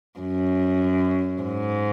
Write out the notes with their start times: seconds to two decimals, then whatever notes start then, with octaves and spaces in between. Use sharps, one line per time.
0.20 F#2
1.42 G#2